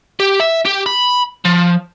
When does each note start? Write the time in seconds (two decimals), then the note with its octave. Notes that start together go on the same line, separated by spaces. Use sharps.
0.20 G4
0.40 E5
0.66 G4
0.86 B5
1.45 F3